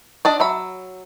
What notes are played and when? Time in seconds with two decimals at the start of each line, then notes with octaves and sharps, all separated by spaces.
0.25 D4 D5 D#5
0.40 F#3 E5 B5